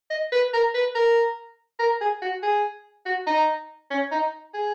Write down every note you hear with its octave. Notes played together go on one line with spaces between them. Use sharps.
D#5
B4
A#4
B4
A#4
A#4
G#4
F#4
G#4
F#4
D#4
C#4
D#4
G#4